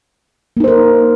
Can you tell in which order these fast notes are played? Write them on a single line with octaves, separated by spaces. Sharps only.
A#3 D#4 C5 A#4